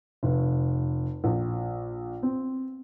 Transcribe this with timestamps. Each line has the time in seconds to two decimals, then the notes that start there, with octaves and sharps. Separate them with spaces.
0.23 F1
1.24 A#1
2.23 C4